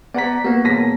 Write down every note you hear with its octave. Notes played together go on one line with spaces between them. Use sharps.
B3 D5 F#5 A#5 B6
A#3 B3 F#4
E1 A#6 B6